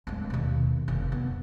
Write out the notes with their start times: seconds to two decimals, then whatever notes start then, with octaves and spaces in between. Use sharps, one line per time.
0.07 D1 G#3
0.30 D#2 B2
0.88 F1
1.12 B3